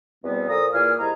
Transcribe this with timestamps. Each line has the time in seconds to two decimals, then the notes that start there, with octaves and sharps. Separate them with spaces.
0.23 E2 B2 G3 B3 C4
0.48 A#2 F3 A4 A#5 D#6
0.73 A#2 E3 A#3 G#4 F6
0.99 C2 D#4 E4 G#4 A#5